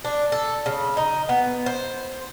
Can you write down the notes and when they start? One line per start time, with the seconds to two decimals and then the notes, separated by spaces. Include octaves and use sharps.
0.05 D4
0.32 A4
0.66 C#3
0.97 D#4
1.29 B3
1.66 C5